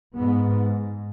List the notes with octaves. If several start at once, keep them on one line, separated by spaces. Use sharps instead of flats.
G#2 B3